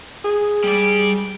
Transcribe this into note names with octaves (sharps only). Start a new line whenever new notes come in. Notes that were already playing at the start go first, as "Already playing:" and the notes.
G#4
G3 D5